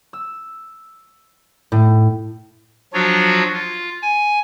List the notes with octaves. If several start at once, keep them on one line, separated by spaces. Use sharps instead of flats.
E6
A2
F3 F#3 D4 F4 F#4 C#5
F4
G#5